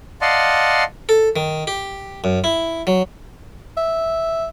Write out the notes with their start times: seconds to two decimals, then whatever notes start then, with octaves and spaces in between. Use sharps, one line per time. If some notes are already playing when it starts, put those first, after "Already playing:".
0.21 D5 D#5 F5 F#5 A5 C6
1.09 A4
1.36 D#3
1.67 G4
2.24 F#2
2.44 E4
2.87 F#3
3.77 E5